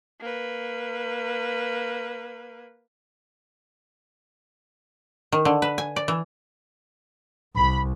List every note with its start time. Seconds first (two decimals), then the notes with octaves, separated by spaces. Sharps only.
0.21 A#3 B4
5.32 D#3
5.45 D3
5.62 B4
5.78 G#5
5.96 D5
6.08 E3
7.56 C2 B5